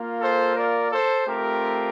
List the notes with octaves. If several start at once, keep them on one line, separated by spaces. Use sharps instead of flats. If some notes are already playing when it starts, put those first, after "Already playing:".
Already playing: A#3 F4
A4 C5
A#4 D5
A4 C5
A3 C4 F4 G4 A#4